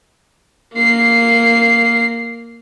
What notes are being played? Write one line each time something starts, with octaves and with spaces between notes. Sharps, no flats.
A#3 C7